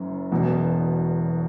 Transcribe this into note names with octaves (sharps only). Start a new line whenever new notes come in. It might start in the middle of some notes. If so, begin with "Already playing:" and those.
Already playing: F#1 F#2
E1 E2 B2